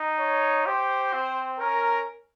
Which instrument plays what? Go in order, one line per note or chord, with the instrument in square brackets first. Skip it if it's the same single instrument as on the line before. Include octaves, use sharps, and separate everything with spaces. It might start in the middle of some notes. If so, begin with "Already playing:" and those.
Already playing: [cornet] D#4
[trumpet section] C#5
[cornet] G4 [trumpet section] C5
[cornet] C4
[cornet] C#4 [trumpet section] A#4